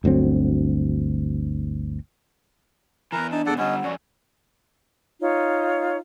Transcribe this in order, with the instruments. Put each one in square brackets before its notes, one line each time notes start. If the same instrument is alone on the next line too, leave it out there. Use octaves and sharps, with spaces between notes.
[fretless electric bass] G1 D2 F#3 C4
[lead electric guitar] E2 E3 [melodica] A#4 B4 A#5
[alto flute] D4 [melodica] D#4 A5 [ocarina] D#5
[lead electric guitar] E2 B2 [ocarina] G#4 [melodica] A4 D5 F#5
[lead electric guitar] D3 G3 [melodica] C#4 [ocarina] D#5 [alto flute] F#5
[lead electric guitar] F2 C#4 [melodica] F#4 [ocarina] D5
[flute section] D#4 F4 C#5